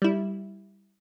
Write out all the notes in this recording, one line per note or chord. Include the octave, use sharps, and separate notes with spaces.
G3 E4